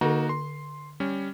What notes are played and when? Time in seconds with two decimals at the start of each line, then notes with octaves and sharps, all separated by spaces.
0.01 D3 A#3 D#4 F#4 A4
0.29 C6
1.00 G3 C#4